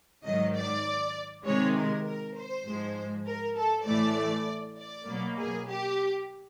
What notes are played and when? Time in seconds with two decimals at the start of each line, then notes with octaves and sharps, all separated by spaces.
0.25 G#2 D#3 F#3 D#5
0.55 D5
1.45 C3 D#3 G#3 C#5
1.76 A#4
2.06 A#4
2.36 C5
2.66 G#2 F3 G#3
3.26 A#4
3.57 A4
3.86 A2 E3 A3 D5
4.76 D5
5.07 B2 F#3 A#3
5.38 G#4
5.68 G4